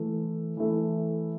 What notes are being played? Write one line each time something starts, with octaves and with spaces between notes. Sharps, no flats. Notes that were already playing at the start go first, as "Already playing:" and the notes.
Already playing: E3 A3 E4 A4
E3 A3 E4 A4